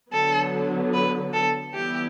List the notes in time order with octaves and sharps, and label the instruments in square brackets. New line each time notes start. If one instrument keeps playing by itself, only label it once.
[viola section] D3 F#3 B3 [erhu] A4
[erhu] B4
A4
[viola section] E3 G3 B3 E4 [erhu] G4